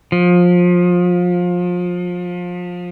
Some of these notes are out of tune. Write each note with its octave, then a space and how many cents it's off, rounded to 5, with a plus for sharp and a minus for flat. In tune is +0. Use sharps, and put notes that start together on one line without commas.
F3 +25